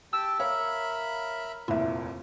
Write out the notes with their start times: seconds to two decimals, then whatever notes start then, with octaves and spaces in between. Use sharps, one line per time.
0.13 G4 G5 A5 E6
0.39 A#4 C#5 E5 F5 B5
1.68 F1 A#1 D#2 E4 E5